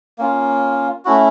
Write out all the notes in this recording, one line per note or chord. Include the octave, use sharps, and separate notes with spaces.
A#3 C#4 F4
A3 C#4 E4 F#4